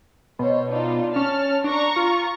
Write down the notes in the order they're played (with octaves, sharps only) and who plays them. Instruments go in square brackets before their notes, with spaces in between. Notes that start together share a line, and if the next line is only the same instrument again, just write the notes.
[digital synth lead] B2 [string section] C5 C#5
[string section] D4 D#4 F4
[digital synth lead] C#4 [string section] A5 F6
[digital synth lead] D4 [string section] A#5 C#6
[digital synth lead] F4